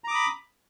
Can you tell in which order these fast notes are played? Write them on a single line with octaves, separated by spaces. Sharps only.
A#5 D6 D#6 B5